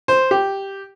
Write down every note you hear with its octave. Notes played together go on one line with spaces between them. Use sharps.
C5
G4